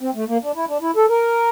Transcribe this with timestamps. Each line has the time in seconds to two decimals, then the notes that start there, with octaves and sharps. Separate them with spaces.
0.01 C4
0.15 A3
0.28 A#3
0.42 D4
0.56 E4
0.68 D4
0.82 E4
0.96 A4
1.10 A#4